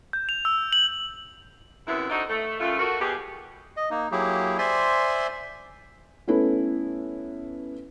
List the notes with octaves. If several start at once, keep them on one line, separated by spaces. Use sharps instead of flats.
G6
F7
E6
F#7
F#2 C3 B3 E4
D4 D#4 F#4 A4 C5 D#5
A3
F#2 A3 F4
A3 F#4 A#4
B2 G4 G#4
D#5
A#3 D#4
F#3 A#3 E4 G4 G#4
C5 D5 E5 G#5 C6
A3 B3 C#4 E4 A4 B4